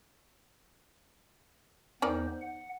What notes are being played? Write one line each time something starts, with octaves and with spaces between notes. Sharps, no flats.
E2 D#3 B3 D#4 C5 D5
F#5